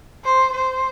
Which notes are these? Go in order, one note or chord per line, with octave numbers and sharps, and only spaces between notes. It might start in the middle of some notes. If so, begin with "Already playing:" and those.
C5
C5